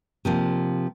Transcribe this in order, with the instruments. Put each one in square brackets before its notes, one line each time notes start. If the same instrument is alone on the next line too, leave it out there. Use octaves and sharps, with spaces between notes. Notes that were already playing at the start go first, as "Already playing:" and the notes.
[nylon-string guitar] C3 F3 A#3